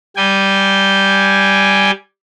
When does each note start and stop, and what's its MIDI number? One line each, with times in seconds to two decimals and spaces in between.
0.17 1.91 55
0.17 1.91 79
0.17 1.91 80